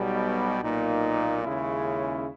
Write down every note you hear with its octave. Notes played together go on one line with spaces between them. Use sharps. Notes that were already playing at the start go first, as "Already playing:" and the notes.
Already playing: B1 B2 G3
B1 A#2 A#3 D#4
D#2 C#3 G#3 C#4 E4